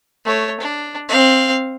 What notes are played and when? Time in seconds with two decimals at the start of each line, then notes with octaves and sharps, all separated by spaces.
0.25 A3 C#5
0.60 D4
1.08 C4 F5